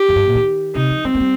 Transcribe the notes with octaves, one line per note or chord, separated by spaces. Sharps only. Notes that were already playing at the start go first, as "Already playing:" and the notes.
Already playing: G4
F2
G2
A#2
D#3
C3 D#4
F3
G3 C4
A#3
G3